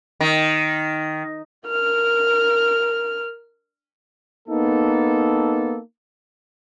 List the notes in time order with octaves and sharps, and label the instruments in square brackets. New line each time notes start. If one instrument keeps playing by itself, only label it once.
[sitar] D#3
[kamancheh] A#4 F6
[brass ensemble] A#3 B3 D#4 A4